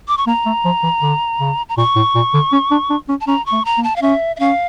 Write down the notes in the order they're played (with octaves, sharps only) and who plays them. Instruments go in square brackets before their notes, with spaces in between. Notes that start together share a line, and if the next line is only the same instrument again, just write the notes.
[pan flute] D6
C#6
[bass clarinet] A#3 [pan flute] A#5
[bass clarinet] A3
F3
E3
D3
C#3
[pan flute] A#5
[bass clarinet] A#2 [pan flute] C#6
[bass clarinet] A2
A#2
D3
C#4
D4
D4
C#4
[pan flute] A5
[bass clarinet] C#4 [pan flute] A#5
[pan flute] C#6
[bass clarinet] A3
[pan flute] A#5
[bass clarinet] A#3
[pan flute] A5
F5
[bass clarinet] C#4 [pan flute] E5
[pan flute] E5
[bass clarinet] C#4 [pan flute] F5